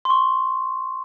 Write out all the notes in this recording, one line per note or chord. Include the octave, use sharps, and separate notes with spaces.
C6
C#6